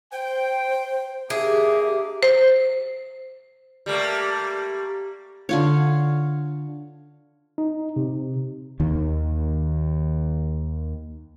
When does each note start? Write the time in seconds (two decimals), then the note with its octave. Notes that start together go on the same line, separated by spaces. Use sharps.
0.12 C5 G5
1.30 A#3 D4 G4 G#4 E5 D6
2.23 C5
3.86 G3 A3 A#3
5.49 D3 F4 C#5
7.58 D#4
7.96 C3
8.80 D#2 D#3